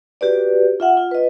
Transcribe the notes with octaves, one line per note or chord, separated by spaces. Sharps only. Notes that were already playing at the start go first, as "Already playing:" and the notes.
F#4 G4 B4 D5
F4 E5 F#5
F4
B4 D#5